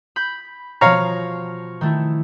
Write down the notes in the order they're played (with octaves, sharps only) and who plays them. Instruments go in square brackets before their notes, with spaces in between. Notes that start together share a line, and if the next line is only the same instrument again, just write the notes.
[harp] B5 G6
[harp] B2 F3 [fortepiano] C#5 F5 A#5
[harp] D#3 A3 E4